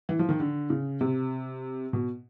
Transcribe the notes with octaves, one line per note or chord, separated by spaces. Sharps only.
E3
F3
D#3
D3
C#3
C3
B2